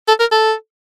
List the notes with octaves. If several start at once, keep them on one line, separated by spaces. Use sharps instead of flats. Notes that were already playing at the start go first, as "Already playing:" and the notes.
A4
A#4
A4